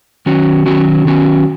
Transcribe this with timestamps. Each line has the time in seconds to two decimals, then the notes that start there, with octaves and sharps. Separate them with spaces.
0.26 D#3 F#3 C#4 F#4
0.66 D#3 F#3 C#4 F#4
1.05 D#3 F#3 C#4 F#4